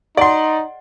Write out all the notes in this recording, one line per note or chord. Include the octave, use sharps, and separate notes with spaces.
D#4 G#4 D5 D#5 F#5 C6